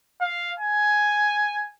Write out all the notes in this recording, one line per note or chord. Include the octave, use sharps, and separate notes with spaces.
F5
G#5